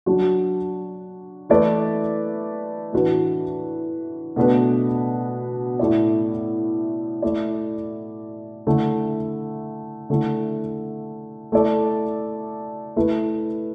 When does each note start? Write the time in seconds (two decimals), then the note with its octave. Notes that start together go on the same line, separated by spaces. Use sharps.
0.06 F#3 D4 F#4
1.49 E3 A3 E4 B4 D5
2.93 A2 E3 D4 F#4 B4
4.36 B2 A3 D4 B4
5.79 A2 A3 E4 D5
7.22 A3 E4 D5
8.67 D3 A3 E4
10.10 D3 A3 E4
11.52 A3 E4 A4 D5
12.96 A3 E4 B4